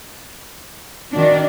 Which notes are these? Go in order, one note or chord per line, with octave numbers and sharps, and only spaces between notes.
D#3 D4 F#4 D5